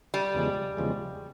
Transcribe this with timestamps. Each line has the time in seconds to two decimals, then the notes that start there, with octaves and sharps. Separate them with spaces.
0.14 G3
0.35 E2 C#3 F3 G#3
0.77 E2 C#3 F3 G#3